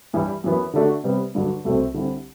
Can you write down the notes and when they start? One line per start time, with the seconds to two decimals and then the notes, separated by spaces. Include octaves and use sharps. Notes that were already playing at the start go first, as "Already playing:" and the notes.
0.13 G2 E3 G3
0.44 F#2 E3 B3
0.73 D3 A3 D4 F#4
1.04 C3 G3 B3
1.35 G2 D3 F#3
1.64 C2 B2 A3 C4
1.94 D3 G3 C4 E4 G4